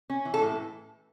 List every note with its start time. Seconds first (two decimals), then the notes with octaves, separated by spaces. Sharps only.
0.10 C#4
0.25 E3
0.34 A4
0.42 A2